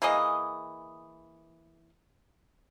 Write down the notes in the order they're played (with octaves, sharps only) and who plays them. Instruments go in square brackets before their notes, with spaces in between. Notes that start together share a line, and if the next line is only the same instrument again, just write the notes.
[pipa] E3 A#3 G#4 D#5